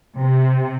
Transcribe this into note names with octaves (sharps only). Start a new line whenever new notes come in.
C3